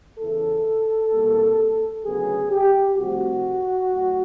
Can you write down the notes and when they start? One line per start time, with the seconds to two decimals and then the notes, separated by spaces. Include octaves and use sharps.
0.20 E2 C#3 E3 A4
1.13 C2 B2 G3 A#3
2.05 D2 C#3 F#3 B3 G#4
2.52 G4
2.98 C2 C3 F3 A3 F#4
3.91 A2 F#3